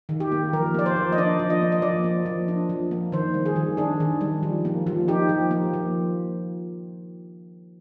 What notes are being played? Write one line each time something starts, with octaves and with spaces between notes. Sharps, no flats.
D#3
G4
A#3
F3 A#4
A#3 D5
C5
F3
D#5
D4 D5
F3
D#5
A#3
D#5
F3 D5
A#3
F3
D4
F3
A#3
D#3 C5
G3
G#4
D#3
D4 G#4
D#3
G3
F3
A#3
F3
D#4 G4
F3
A#3
F3